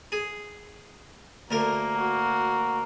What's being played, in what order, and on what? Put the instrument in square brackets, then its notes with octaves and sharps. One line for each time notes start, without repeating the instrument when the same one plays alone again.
[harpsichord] G#4
[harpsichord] D2 A#4 [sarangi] A#3 [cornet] A#5
[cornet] F#4